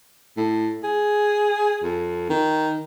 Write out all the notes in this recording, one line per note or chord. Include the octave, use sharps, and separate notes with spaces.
A2
G#4
F2
D#3